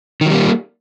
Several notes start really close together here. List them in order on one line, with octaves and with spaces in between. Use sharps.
D#3 F#3 G3 A#3